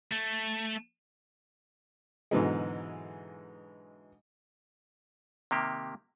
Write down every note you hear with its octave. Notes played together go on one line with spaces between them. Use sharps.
A3
G#2 B2 D3 E3 F#3 G#3
C3 D#3 A#3 G4